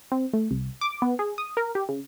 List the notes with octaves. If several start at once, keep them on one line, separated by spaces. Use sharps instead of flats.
C4
A3
C2
D6
B3
G#4
D#6
A#4
G4
C#3